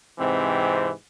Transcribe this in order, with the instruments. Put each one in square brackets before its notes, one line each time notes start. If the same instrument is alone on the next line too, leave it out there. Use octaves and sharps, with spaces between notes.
[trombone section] G#2 C3 E3 C4